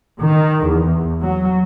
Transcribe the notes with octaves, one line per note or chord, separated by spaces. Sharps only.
D#3
E2
F#3